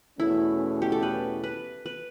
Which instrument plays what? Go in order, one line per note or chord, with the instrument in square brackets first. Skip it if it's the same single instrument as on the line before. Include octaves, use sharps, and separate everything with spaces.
[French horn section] E2 B2 A3 C#4 [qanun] E4
[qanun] G4
A4
B4
B4
B4